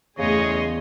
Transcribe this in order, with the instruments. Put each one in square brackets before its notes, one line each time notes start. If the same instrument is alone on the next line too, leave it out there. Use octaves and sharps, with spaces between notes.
[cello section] E2 A3 [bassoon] C#3 [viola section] G#4 D#5 C6 [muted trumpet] C#5